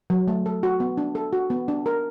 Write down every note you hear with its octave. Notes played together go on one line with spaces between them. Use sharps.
F#3
A3
A4
F#4
B3
D4
A4
F#4
B3
D4
A#4